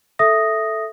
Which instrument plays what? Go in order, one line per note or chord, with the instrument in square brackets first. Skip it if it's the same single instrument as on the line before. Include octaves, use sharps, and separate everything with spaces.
[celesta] A4 E5 D#6 A#6